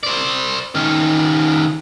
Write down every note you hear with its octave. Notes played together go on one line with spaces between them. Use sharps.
C5 D5
D#3 C#4